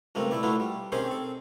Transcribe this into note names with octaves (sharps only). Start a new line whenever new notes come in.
C#2 G2 A3 A#3 C4
A3 E4 D5
F#3 A3 B3 D4 E4 F4
G3
D#3 C4 C#4 G4 G#4 C5
C4 A4